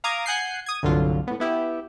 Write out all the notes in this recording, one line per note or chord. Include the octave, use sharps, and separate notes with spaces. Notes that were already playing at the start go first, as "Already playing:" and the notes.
F5 A#5 D6 D#6 G#6
F#5 G#5 F#6 G6 C7
D#6 G#6
G1 C2 D3 F#3 F4
A2 B3
B3 E4 G4